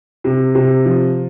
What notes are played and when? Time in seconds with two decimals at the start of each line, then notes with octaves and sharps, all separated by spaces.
0.24 C3
0.55 C3
0.86 F3